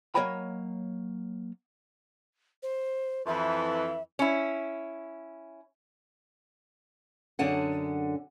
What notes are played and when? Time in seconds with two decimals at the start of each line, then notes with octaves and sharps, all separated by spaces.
0.15 F#3 A#3 C#5 D#5 G5 B5
2.63 C5
3.27 F2 E3 E5
4.19 C#4 E4
7.39 F#2 D3 D4 G#4 F#5